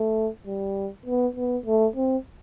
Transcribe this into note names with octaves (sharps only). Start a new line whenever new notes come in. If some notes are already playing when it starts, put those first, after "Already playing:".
Already playing: A3
G3
B3
B3
A3
C4